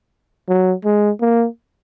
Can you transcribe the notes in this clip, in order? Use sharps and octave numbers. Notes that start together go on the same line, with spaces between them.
F#3
G#3
A#3